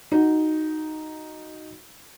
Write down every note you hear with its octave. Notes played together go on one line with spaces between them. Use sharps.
D#4 F#4